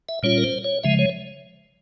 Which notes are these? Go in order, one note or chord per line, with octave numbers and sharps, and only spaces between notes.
E5
A#2 G3 C#4 F4 C#5
A#4
C5
C#5
C#3 F3 G#3 E5
C#5